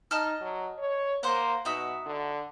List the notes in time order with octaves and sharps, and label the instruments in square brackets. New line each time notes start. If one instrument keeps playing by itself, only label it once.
[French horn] D#4 [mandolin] D#5 A5 F6
[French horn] F#3
C#5
[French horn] A#3 [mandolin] C5 F#5
[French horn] B2 [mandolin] D#4 F#4 E5
[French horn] D3